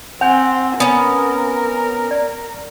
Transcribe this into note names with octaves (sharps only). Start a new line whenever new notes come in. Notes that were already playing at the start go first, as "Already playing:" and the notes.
C4 F#5 G#5 G6 F7
B3 C#4 A#4 G#5
D5